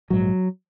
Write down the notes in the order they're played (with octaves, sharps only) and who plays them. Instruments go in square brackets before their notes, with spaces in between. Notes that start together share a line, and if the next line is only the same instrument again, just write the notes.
[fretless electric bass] A#1 G#2 F#3